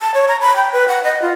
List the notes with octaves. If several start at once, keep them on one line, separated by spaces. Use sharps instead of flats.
A5
C#5
A#5
B5
G5
B4
F#5
D#5
F4